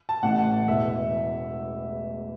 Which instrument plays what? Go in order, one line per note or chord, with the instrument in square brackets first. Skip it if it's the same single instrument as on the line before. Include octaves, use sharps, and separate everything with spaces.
[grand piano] A5
A1 A2 E3 F#5
E1 E2 E3 E5